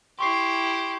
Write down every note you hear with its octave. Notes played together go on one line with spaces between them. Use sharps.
E4 G4 C6 C#6 C7